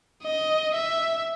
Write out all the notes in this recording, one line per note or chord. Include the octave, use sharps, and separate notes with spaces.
D#5
E5